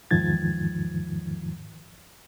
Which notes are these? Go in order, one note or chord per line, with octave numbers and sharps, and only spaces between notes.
E2 G#2 D#3 F3 G#6 A6